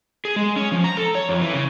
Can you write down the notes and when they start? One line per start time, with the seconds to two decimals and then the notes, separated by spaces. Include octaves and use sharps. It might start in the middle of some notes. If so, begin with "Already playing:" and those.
0.25 G#4
0.36 G#3
0.56 C#4
0.72 F3
0.84 A#5
0.97 A4
1.15 C#5
1.29 F2
1.41 E3
1.53 C#3